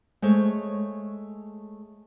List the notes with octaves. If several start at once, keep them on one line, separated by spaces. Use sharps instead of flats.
G#3 A3 C5 C#5